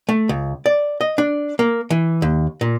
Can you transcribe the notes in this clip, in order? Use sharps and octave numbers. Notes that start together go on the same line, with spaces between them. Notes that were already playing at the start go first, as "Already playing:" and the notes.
A3
C#2
D5
D#5
D4
A#3
E3
D#2
A#2